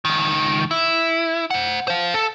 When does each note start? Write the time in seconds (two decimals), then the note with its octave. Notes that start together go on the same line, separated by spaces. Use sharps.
0.05 C#2 D#3
0.71 E4
1.51 C5 F#5
1.88 C5 F5
2.14 A4